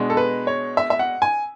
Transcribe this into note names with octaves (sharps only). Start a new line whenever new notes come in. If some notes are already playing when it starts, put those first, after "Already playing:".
Already playing: B2 G#3 D4
A4
B4
C#5
E5
E5
F#5
G#5